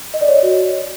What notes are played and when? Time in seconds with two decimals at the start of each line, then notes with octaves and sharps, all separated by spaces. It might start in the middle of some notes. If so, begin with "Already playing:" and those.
0.14 D#5
0.21 D5
0.28 C#5
0.36 D#5
0.43 F#4